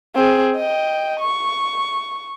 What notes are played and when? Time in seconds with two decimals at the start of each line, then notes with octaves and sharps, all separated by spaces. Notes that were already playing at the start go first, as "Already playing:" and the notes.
0.16 C4 G#4
0.56 D#5 G5
1.20 C#6